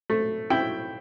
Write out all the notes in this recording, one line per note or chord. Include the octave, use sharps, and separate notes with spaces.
A3
E4 G5